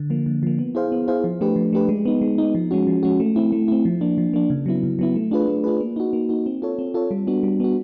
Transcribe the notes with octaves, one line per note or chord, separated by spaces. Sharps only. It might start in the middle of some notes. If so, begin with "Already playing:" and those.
Already playing: D3
F3 A#3
D3
F3 A#3
B3
E4 G#4 C5 F5
B3
E4 G#4 C5 F5
F3
A3 D4 G4 B4
F3
A3 D4 G4 B4
G#3
B3 D#4
G#3
B3 D#4
F3
G#3 C#4 F#4
F3
G#3 C#4 F#4
A3
C4 E4
A3
C4 E4
F3
A#3 D4
F3
A#3 D4
C#3
F#3 B3 E4
C#3
F#3 B3 E4
A3
D4 F4 G#4 B4
A3
D4 F4 G#4 B4
A#3
D#4 F#4
A#3
D#4 F#4
C4
F4 A4 C#5
C4
F4 A4 C#5
G3
B3 D4 F#4
G3
B3 D4 F#4